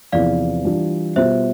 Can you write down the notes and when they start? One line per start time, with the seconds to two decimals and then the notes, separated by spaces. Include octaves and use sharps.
0.12 E2 C3 F3 B3 E4 D5 F5
0.65 E3 G3 D4 F4
1.16 B2 G3 B3 F4 C5 E5